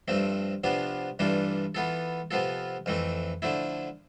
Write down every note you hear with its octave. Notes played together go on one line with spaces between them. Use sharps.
G2 F3 A3 C4
C3 F3 B3 D4 F4
G2 E3 A3 D4 F4
E3 B3 F4 A4
C3 F3 B3 F4 A4
F2 E3 A3 C4
D3 F3 A3 E4